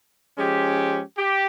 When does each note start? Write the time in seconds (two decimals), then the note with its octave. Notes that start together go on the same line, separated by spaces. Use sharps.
0.37 F3 G#3 C#4 G4
1.17 G4